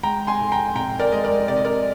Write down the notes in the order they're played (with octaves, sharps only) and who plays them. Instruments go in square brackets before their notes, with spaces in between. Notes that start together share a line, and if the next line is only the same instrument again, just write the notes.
[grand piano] G#3 G5 A#5
G#5 C6
F1
G5 A#5
F1 G5 A#5
A#4 D5
G#3 D#5
A#4 D5
C3 D5
D#5
A#4 D5